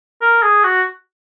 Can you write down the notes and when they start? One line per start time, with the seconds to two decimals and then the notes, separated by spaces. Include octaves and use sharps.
0.22 A#4
0.43 G#4
0.64 F#4